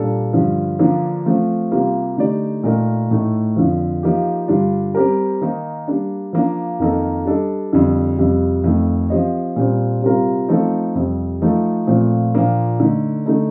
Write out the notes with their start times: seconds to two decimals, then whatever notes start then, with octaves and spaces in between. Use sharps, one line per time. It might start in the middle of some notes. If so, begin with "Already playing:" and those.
Already playing: A#2 G3 D4 A4
0.33 G2 D3 F3
0.79 D3 F3 A#3 D4
1.26 F3 A3 C4
1.71 C3 G3 A#3 F4
2.18 D3 A3 D#4 G4 D5
2.63 A#2 A3 D#4 A#4 D#5
3.11 A2 A3 D#4
3.56 F2 D3 F3
4.03 F3 A#3 D#4 G4
4.48 G2 D3 G3 D4 F4
4.95 G3 C4 G4 A#4
5.41 D#3 A#3 D#4
5.87 G3 A#3 D4
6.33 F3 A#3 D4
6.79 F2 D#3 A#3 D#4 A4
7.25 G3 D4 A4 D#5
7.73 F2 D3 G3
8.18 F2 C3 G3
8.64 F2 D#3 A3
9.10 F3 C4 G4 C5 D#5
9.56 A#2 G3 C4
10.02 C3 G3 C4 F4 A#4
10.49 F3 A3 C4 D#4 A4
10.95 F2 C3 G3
11.42 F3 A3 D#4 A4
11.87 A#2 F3 A3 C4
12.34 A#2 F3 A#3 D4
12.80 D3 A3 D#4
13.26 D3 A3 D#4 A4